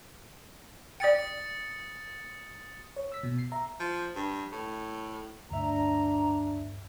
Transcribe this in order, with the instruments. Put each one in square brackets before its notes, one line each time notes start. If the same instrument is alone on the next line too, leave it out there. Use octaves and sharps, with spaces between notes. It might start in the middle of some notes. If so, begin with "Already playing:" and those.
[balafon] D5 G5 [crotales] D#6 A6 C#7
[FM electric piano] C#5
E6 B6
B2
C7
E5 A#5
[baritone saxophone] F3
G2
A2
[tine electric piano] D2 G2 E5 [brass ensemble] D4 [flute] A#5